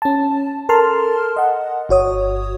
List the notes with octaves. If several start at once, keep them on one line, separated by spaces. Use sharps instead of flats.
C#4 A5
A4 A#4 A5 C6 F6
D#5 F#5
G1 F#4 C#5 D#6